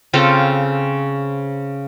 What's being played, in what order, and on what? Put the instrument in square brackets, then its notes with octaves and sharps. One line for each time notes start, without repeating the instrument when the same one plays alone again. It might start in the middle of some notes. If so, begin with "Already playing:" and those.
[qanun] C#3 C4 F4 A4